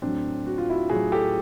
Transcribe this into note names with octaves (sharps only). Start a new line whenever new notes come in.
A2 F#3 C4 D4
F#4
F4
E4 F#4
A2 F#3 F#4 G#4
G4 A4